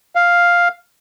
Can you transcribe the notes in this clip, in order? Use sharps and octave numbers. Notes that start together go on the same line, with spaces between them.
F5